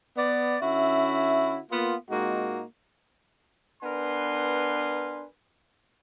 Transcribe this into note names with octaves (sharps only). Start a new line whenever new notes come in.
B3 D5
D3 C#4 E4 F#4 E5
A#3 B3 F4
A#2 G#3 A#3 C4 D#4 F#4
B3 D4 A#4 B4 G#5 C6